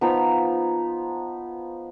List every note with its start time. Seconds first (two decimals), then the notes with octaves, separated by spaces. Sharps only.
0.01 F3 B3 D#4 A#5